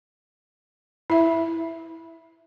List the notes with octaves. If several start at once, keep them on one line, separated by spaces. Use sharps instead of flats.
E4 E5